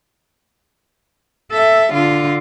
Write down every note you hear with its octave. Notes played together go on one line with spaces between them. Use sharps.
A4 E5
D3 F4